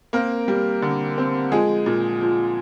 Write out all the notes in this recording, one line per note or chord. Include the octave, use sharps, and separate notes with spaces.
A#3 C4 A#4
G3
D3
C4
F3 G#3 G#4
A#2
F3